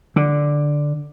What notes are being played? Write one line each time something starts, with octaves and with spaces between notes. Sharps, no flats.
D3